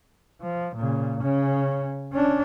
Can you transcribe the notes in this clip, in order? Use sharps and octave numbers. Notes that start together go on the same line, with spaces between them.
F3
A#2 C#3
C#3 C#4
C#4 D4